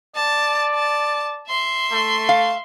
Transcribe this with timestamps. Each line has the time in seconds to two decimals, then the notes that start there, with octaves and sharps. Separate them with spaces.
0.15 D5 A5
0.74 A5
1.48 E5 C6
1.92 A3
2.29 F5